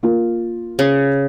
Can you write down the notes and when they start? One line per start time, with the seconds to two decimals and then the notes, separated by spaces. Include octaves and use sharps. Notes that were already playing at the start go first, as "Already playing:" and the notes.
0.03 A#3 F4
0.79 C#3